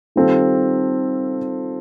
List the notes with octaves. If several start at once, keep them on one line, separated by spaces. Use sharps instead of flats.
D#3 G3 C4 F4 A4